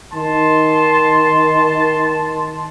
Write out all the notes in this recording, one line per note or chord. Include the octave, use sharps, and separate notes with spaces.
D#3 A5 C6